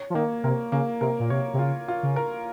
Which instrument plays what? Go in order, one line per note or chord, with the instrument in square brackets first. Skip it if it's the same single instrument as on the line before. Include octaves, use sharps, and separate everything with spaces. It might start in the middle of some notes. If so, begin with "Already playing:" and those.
Already playing: [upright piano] C#5
[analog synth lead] F3
[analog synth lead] D#3 [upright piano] A#3
[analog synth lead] C3 [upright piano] A#4
[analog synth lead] C#3 [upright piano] A#3
[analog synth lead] C3 [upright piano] A#4
[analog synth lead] A#2
[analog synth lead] C3 [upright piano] C#5
[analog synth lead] C3
[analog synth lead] C#3 [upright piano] F4
[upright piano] F4
[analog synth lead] C#3
[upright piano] A#4